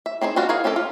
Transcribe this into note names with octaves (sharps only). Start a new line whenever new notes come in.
E5
C4 D#4 G#4 C5
G3 D4 F4 F#4
G#4 A#4 C#5 F5
C4 C#4 G4 A4
F4